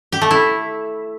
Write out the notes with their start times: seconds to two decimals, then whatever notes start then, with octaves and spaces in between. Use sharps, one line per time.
0.12 G4
0.22 A3
0.31 E4